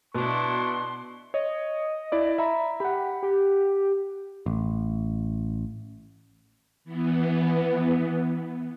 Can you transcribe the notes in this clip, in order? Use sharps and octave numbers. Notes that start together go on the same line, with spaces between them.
B2 D4 E4 C6 C#6
C#5 D#5
E4 D5 D6
E5 A#5 B5
G4 F#5 B5
G4
A1
E3 B3